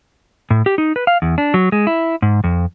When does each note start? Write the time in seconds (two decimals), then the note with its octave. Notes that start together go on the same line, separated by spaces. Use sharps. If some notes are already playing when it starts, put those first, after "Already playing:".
0.51 A2
0.66 G4
0.78 D#4
0.96 B4
1.07 F5
1.22 E2
1.38 D4
1.54 F#3
1.72 G#3
1.87 E4
2.22 G#2
2.44 F2